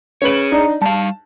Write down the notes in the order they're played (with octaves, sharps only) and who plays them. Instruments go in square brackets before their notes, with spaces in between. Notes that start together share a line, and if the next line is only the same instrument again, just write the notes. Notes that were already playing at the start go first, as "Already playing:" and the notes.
[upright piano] C#4 B4 F#7 [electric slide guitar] G#4 C#5
[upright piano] D4 D#4
[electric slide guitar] G3 F5 [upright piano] A5